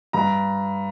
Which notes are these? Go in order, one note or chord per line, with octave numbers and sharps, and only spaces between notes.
G2 A#5